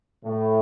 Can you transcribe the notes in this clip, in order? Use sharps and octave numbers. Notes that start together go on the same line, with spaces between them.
A2